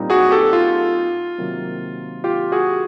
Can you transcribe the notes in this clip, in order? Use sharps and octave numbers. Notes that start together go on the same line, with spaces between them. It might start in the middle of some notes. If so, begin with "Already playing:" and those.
Already playing: A#2 G3 C4 D#4
F#4 G#4
G4 A4
F4
C3 D#3 F#3 A#3
F4 G4
F#4 G#4